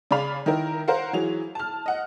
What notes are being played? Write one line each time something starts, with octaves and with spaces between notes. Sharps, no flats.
C#3 D5 F5 B5 F7
D#3 E4 A#4
A#4 C5 F5 F#5
E3 F#3 G#4 F7
A5 F6
D#5 F#5